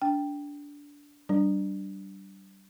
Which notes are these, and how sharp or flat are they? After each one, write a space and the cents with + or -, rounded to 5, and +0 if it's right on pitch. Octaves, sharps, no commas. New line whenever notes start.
D4 -20 G5 +0
G3 -25 D4 +0